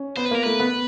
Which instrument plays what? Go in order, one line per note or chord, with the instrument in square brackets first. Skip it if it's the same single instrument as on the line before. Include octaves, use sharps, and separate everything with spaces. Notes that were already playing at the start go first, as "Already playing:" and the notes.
Already playing: [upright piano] C#4
[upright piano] B3 [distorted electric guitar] C5
[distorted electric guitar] B4
[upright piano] A#3
[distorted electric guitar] A#4
[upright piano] A3 [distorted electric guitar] B4
[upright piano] B3